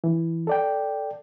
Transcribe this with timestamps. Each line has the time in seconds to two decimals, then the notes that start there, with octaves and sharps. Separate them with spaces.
0.04 E3
0.47 A4 D5 G5